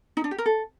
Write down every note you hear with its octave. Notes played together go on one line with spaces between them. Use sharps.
D#4
D4
G4
A#4
A4